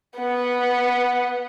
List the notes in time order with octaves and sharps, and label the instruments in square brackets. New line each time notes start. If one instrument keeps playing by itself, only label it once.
[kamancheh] B3 F#5